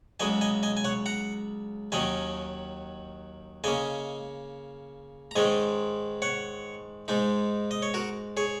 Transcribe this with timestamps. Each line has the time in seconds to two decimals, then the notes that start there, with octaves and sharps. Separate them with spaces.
0.20 C#2 C#3 F#3 D#5 G#5
0.41 D#5 G#5
0.63 D#5 G#5
0.77 G#5
0.84 C#5 F#5
1.06 F#5 A#5
1.92 D#2 D#3 F#3 C#4 D#5 G#5
3.64 C#3 A#3 C#4 D#5 G#5
5.31 A#5
5.36 G#2 D#3 G#3 C#4 D#5 G#5
6.22 C#5 F#5
7.08 G#2 G#3 D#4
7.71 D#5
7.82 C#5
7.94 F#4 A#4
8.37 G#4 C#5